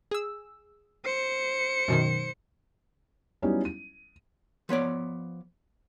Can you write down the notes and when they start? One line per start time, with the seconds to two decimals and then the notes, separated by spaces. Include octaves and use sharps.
0.11 G#4 E6
1.05 C5 C#7
1.88 F#2 B2 D#3
3.42 F#3 G3 B3 C#4 D#4 E4
3.65 D#7
4.69 F3 B3 C#5 D5